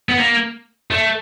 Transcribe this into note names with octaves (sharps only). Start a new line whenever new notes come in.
B3
A#3
A3